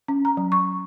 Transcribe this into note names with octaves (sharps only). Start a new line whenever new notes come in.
C#4
A#5
F#3
C#6